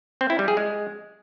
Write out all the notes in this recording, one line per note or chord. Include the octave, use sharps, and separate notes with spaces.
C4
E4
G3
G#4
G#3